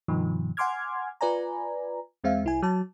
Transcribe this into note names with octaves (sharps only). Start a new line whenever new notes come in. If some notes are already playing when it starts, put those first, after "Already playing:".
G2 B2 D#3 F3
F#5 G#5 C6 D6 F6 G#6
F4 B4 D5 G#5 A#5
E2 G#3 C4 E5 F5
C2 E4 G#5
F#3 A5